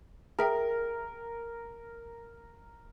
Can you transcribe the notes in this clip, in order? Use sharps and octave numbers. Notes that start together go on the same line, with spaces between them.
G#4 A#4 E5 G5